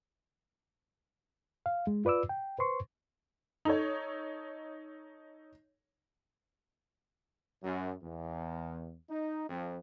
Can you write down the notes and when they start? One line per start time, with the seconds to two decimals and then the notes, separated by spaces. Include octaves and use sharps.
1.66 F5
1.87 G#3
2.05 F4 B4 D5 D6 E6
2.29 G5
2.59 B4 C5 C6 C#6
3.65 D#4 A4 C#5
7.63 F#2
8.03 E2
9.09 D#4
9.49 F2